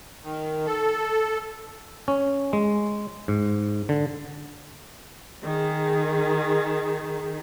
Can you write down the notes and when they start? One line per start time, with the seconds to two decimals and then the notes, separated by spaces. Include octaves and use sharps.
0.23 D#3
0.66 A4
2.08 C#4
2.53 G#3
3.28 G#2
3.89 D3
5.42 D#3 G#4